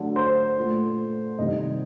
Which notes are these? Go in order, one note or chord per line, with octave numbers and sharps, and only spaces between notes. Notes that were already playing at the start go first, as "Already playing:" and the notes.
Already playing: D3 F#3 A3
C5
A#2 A3
C3 D#3 G3 D#5